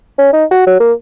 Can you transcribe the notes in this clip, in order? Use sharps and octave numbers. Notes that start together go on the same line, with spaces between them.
C#4
D#4
F#4
F#3
A#3